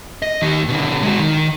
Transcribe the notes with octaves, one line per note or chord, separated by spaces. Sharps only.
D#5
D#2 D#3
B2 D3
G#3 F#4
D#3